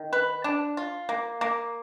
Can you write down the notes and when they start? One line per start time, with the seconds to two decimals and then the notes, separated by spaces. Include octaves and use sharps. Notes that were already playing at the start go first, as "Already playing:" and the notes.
Already playing: D#3
0.13 B4
0.44 D4
0.77 F4
1.09 A#3
1.41 A#3